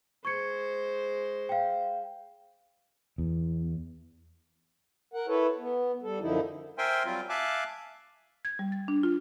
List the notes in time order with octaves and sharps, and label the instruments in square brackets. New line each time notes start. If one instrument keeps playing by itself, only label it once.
[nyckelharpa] G#3 C5 [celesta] C#6 G#6 C#7
[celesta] F5 G5
[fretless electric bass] E2
[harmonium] A#4 F#5
E4 A4 B4 C#5
B3
G3 A4
F#2 D3 F3 D#4 E4
[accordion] A#4 C5 E5 G5 G#5 C6
F#3 G3 C4 F4
E5 F5 G#5 A5 D6 F#6
[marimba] G#6
G3
A6
D4
F4